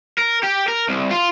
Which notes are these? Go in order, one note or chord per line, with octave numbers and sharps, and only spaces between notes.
A#4
G4
A#4
C2
F4